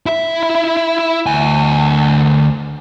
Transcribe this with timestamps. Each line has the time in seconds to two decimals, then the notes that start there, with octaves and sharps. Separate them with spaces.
0.06 E4 E5
1.27 D2 G#5